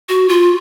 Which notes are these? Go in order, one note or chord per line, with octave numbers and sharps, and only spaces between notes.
F#4
F4